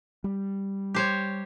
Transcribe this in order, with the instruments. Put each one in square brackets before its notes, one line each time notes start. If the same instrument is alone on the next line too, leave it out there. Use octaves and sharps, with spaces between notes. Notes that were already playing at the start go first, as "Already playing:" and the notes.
[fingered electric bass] G3
[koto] G4 C5 C#5